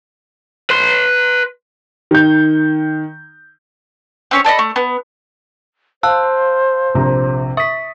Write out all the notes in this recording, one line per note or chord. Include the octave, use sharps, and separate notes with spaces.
B4 C6
D#3 G6
C4 C#4 C#5
A4 D5 D#5 B5
A3
B3
C5 F5 A5 E6 F#6
A#1 C3 A#5
E5 C#6 D#6 B6